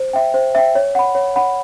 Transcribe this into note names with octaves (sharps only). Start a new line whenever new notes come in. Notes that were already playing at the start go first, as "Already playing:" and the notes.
Already playing: C5
E5 G5
C5
E5 G5
C#5
F#5 B5
C#5
F#5 B5